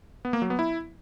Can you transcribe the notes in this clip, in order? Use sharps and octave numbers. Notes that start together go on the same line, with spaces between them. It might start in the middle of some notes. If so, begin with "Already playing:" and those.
B3
A#3
F#3
B3
E4